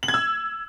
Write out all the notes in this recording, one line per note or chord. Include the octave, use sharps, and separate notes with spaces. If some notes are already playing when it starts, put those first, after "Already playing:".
F#7
G#6
E6